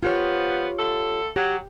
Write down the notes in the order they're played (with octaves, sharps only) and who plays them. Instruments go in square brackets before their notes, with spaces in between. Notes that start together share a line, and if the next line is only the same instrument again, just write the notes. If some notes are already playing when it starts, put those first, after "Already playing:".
[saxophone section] F3 B3 [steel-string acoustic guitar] F4 G4 C#5
[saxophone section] D3 A3 A4
[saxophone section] F#3 [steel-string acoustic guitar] G4